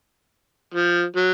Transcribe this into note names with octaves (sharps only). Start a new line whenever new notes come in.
F3
F#3